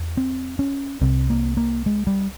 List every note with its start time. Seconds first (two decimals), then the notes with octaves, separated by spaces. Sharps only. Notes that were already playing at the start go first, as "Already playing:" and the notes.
Already playing: E2
0.17 C4
0.59 C#4
1.01 C2 C3 C4
1.30 A#3
1.57 A#3
1.86 G#3
2.07 G3